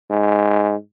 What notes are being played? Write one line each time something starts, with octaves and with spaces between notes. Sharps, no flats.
G#2